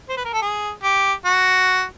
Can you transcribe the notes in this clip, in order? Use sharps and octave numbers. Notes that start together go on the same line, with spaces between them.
C5
B4
A#4
A4
G#4
G4
F#4